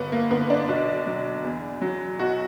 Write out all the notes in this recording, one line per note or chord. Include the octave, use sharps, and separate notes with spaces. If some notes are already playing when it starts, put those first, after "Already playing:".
Already playing: G1 B3
A#3
D3 B3
D4
B1
F#3
E2
F#3
B1 F#4